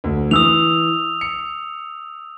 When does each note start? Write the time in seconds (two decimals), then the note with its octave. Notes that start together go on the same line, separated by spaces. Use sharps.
0.04 D2
0.31 E3 D#6 E6 F7
1.21 C#7